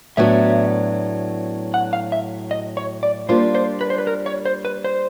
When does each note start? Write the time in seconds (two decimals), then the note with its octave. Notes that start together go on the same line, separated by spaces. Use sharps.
0.17 A2 F#3 B3 D4 F#4 E5
1.74 F#5
1.93 F5
2.12 E5
2.51 D#5
2.77 C#5
3.03 D5
3.29 G3 A#3 D4 F4 C5
3.55 C5
3.81 B4
3.90 C5
3.98 B4
4.07 A#4
4.26 C#5
4.45 C5
4.65 B4
4.84 C5